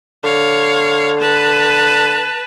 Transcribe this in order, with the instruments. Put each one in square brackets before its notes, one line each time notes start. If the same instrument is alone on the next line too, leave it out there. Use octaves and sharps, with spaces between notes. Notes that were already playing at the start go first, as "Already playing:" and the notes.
[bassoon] D3 [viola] C#5 F5
[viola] B4 A5